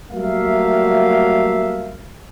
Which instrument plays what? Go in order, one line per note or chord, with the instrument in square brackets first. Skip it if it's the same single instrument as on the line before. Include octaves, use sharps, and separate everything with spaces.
[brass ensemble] F#3 G3 A3 A#3 E5 F5